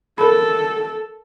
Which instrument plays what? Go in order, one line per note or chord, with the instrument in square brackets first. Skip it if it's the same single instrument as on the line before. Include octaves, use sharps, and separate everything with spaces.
[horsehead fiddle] A4 [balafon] A#4 B5